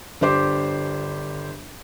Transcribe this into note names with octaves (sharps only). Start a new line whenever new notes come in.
G1 D4 G4 C5 D6